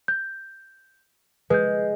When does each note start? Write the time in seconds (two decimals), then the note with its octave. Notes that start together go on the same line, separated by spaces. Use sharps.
0.08 G6
1.50 G#3 B4 G6